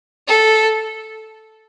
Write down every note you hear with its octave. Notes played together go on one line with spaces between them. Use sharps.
A4